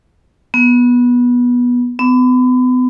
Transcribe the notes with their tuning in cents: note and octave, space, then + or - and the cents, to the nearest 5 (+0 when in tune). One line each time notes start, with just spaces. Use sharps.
B3 -15
B3 +35